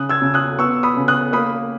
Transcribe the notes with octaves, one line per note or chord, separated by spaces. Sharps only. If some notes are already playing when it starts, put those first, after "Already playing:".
Already playing: C#3 D#6 F#6
E6 G#6
C#3
D#6 F#6
B3 C#6 E6
B5 D#6
C#3
D#6 F#6
A#3 B5 D#6